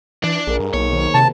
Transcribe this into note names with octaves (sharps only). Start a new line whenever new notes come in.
E3 D4
A#1 G#4 A#4
G2
B1 A#3 D#4 C#5
D#3 C5
C3 A5